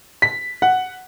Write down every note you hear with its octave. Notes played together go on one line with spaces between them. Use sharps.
B6
F#5